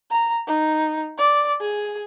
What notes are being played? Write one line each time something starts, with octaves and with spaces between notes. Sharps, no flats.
A#5
D#4
D5
G#4